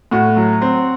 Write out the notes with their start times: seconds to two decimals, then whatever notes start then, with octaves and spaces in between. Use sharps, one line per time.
0.11 A2 F#4
0.37 F#3
0.61 C4